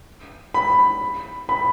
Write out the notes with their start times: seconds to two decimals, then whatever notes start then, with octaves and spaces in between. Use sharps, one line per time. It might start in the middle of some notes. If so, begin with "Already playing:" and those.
0.54 B5
1.49 B5